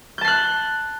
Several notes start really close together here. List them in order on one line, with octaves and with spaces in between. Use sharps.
G6 A5 C7 F#6